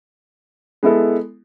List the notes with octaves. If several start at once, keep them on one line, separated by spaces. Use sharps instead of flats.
G#3 B3 E4 A4